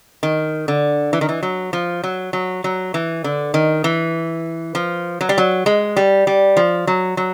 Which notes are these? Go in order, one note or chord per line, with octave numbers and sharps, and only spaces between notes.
D#3
D3
E3
D#3
E3
F#3
F3
F#3
F#3
F#3
E3
D3
D#3
E3
F3
F#3
G3
F#3
G#3
G3
G3
F3
F#3
F#3